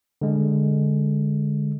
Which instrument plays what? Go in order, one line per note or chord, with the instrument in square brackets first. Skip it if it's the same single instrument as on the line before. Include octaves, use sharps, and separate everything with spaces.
[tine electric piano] D3 G#3